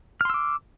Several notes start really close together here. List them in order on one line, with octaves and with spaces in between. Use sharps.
F6 C6 E6 D6